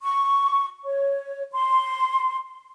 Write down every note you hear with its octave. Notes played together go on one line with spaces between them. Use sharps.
C#6
C#5
C6